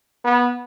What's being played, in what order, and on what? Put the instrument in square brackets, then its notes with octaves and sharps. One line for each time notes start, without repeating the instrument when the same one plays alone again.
[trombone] B3